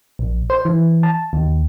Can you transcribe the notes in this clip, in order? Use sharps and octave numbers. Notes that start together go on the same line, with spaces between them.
A#1
C5
E3
A5
D#2